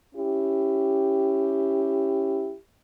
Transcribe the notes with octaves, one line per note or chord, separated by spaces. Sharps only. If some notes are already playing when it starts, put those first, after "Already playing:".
C#4 E4 G4